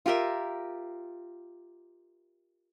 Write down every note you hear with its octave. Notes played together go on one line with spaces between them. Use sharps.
F4 G4 A#4 E5